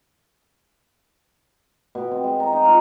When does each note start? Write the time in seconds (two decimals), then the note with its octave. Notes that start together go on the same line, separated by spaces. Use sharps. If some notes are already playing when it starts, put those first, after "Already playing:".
1.95 B2
2.11 C4
2.24 G#3
2.40 A#5
2.53 D#4
2.65 F4